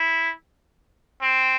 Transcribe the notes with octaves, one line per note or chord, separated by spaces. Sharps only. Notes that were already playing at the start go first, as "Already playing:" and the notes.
Already playing: E4
C4